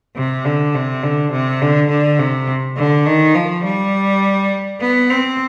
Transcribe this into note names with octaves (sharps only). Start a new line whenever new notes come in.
C3
D3
C3
D3
C3
D3
D3
C3
D3
D#3
F3
G3
B3
C4